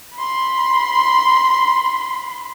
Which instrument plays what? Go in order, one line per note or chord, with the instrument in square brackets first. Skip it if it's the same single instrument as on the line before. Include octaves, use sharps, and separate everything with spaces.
[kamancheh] B5 C6